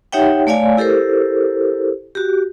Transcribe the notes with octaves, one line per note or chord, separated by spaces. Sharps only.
D#4 G4 C#5 E5 F#5 G5
A3 C#5 D5 F5 G#5
E4 G4 A4 A#4 C5
F#4 G4